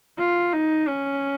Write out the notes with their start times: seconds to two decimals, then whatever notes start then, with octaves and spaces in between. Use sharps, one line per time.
0.18 F4
0.53 D#4
0.88 C#4